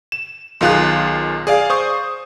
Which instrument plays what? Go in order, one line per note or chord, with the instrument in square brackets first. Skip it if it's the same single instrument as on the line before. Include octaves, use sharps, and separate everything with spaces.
[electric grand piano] E7
B1 D#3 F4 G#4 F#6
G#4 D5 F5
C5 C#6 D#6